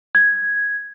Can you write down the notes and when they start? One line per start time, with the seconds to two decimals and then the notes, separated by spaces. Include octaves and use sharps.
0.15 G#6